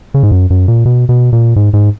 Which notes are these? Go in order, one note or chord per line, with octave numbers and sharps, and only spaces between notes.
C#3
G#2
F#2
F#2
A#2
B2
B2
A#2
G#2
G#2